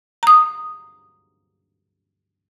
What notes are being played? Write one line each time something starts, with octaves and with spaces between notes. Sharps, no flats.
A#5 D#6